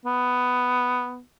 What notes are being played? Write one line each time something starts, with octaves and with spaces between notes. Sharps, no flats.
B3